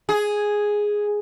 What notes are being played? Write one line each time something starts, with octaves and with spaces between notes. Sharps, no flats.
G#4